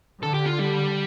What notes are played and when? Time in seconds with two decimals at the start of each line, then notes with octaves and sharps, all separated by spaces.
0.23 D3 A4
0.34 G4
0.46 F4
0.59 G3